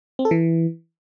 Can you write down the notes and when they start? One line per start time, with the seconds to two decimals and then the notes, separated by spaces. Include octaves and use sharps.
0.19 C4
0.25 A4
0.31 E3